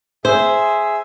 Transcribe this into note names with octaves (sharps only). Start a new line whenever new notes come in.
G#4 C5 E5